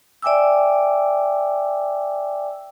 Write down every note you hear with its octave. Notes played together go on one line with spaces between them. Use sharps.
D5 E5 G5 G#5 D6 E6